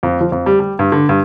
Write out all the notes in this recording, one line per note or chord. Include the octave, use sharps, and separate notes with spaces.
F2
F3
F2
G3
G3
G2
D3
G2